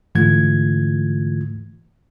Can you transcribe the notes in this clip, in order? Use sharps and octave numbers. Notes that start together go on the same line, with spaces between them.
G#2 D3 E3 A3 F4 G#6